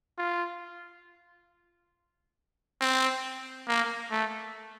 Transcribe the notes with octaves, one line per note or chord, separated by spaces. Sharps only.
F4
C4
A#3
A3